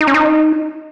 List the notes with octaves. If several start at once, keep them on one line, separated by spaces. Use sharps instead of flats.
D#4
C#4
D#4